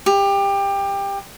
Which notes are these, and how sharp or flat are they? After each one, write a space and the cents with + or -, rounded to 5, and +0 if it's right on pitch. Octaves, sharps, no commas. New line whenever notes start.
G4 +20